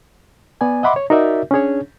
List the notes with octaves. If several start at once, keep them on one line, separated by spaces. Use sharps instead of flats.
B3 D5 G#5
D#5 E5 F#5 B5 C6 D6
C#5
D#4 F#4 A#4 D5 E5
C#4 D4 G#4 C#5